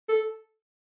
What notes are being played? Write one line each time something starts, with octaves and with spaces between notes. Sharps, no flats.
A4